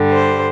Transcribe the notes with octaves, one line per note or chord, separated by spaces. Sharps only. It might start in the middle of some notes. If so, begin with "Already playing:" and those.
Already playing: G2 D3 G3
C5